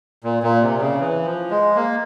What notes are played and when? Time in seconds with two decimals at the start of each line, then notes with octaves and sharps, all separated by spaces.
0.24 A#2
0.43 A#2
0.62 C3
0.81 C#3
1.00 E3
1.25 F3
1.50 G#3
1.76 A#3